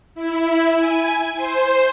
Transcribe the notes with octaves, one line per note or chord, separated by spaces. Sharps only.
E4
G#5
C5